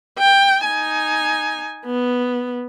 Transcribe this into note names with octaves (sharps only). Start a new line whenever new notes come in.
G5
D#4 G#5
B3